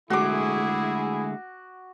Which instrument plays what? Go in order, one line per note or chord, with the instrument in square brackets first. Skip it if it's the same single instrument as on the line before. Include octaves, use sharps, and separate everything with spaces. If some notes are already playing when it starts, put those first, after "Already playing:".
[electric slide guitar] D3 G#3 A3 [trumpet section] E4 G#4 [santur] F#4 D6